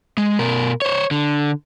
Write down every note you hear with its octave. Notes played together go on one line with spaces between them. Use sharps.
G#3
B2 A#4
C5 C#5
D3